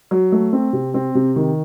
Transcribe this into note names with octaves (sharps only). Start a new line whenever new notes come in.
F#3
A3
C4
C3
C4
C3
D#3